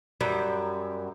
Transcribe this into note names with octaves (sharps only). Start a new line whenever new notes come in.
F#2 G3